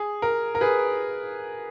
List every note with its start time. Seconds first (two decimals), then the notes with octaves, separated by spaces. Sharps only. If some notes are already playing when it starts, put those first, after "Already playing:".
Already playing: G#4
0.22 A#4
0.55 A#4
0.61 G#4 B4